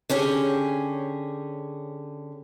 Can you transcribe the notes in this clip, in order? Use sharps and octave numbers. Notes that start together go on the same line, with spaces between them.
D3 C#4 G4 G#4